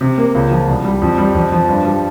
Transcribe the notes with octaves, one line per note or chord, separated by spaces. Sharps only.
C3
A#3
C#2
F3
C2
G3
F2
G3
F2
F3
G2
G3